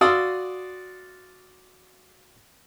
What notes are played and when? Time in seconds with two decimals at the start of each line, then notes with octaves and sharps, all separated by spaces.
0.01 F#4 D5 F5 C6 D#6 E6